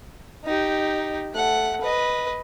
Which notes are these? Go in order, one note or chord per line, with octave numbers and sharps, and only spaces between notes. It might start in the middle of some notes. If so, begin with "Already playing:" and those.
D#4 G4
A3 F#5
B4 D#5